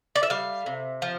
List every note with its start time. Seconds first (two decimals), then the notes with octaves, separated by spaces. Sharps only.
0.16 D5
0.23 E5
0.30 G3 F5
0.66 C3
1.02 F3